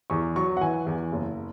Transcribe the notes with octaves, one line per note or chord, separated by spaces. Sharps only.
E2 C#6
F#3 C#6
F#5
E3 G#5
E2
F#1